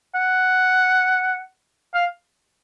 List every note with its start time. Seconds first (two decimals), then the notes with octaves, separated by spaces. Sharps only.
0.14 F#5
1.94 F5